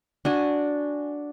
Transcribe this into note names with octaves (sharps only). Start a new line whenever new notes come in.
D4 F#4 G#5